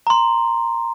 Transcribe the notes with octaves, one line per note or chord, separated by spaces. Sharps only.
A#5 C6